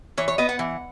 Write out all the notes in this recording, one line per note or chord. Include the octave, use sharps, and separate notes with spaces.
E3 C#5
C#5
B3 D#5
F#5
E3